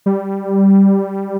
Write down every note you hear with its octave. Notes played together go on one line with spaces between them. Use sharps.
G3